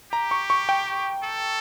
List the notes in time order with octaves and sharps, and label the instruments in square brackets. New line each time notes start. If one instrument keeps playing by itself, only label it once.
[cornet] G4 [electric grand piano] A#5
[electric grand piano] C#6
C#6
G5
[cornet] A4